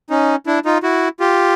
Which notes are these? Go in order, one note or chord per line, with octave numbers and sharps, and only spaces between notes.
C#4 D#4
D4 E4
D#4 F4
E4 F#4
F4 G4